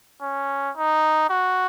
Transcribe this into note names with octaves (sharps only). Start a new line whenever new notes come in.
C#4
D#4
F#4